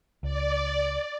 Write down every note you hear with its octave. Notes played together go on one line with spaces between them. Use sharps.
C#2 D5